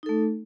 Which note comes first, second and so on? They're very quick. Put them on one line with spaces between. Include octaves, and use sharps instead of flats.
D#4 A4 A3